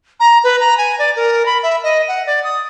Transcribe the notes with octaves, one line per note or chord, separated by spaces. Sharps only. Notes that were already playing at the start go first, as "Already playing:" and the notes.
A#5
B4
A#5
G#5
D5
A#4
B5
E5
D#5
F#5
D5
D#6